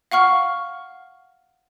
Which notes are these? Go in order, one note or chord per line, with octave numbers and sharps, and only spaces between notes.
F5 F#5 C#6 F6